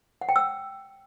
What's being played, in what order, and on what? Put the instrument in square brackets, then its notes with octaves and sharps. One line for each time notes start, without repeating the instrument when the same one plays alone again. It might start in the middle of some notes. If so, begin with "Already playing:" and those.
[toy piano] F#5
G5
E6